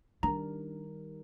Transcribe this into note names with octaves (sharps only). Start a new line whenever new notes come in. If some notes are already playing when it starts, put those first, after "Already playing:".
D#3 G3 D4 A#4 A#5